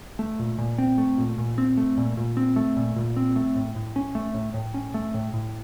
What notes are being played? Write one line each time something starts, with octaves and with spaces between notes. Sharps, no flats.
A3
A#2
A#2
C4
A3
A#2
A#2
C4
A3
A#2
A#2
C4
A3
A#2
A#2
C4
A3
A2
A2
C#4
A3
A2
A2
C#4
A3
A2
A2